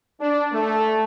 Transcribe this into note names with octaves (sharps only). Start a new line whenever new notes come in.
D4
A3